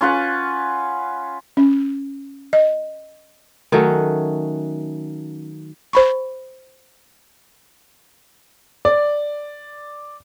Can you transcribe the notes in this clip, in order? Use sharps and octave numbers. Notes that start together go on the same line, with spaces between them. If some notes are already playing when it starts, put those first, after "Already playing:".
C#4 F4 B4 F#5
C#4
D#5
D#3 F#3 A3 C#4
C5 B5 C#6
D5